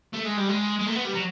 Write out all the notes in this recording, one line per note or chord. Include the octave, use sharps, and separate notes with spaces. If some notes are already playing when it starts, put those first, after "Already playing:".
A3
G#3
G3
G#3
G#3
A3
B3
G3
F#3